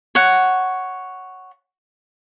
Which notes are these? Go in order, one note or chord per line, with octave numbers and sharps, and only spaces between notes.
C#5 F#5